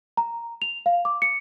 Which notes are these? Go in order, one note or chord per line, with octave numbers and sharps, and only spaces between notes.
A#5
F7
F5
D6
C#7